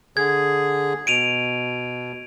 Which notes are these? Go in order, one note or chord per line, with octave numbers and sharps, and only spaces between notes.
D3 G#4 G#6
B2 D7 D#7 F7